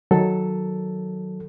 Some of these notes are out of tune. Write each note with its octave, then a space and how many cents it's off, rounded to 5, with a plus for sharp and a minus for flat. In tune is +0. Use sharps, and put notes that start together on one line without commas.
D#3 +0 F#3 +0 A4 +0